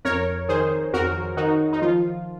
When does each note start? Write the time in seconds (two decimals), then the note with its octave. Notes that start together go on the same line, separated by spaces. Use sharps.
0.05 F2 A#4 C#5
0.49 D#3 G#4 C5
0.93 F2 F#4 A#4
1.37 D#3 D#4 F#4
1.73 D#4
1.82 F3 F4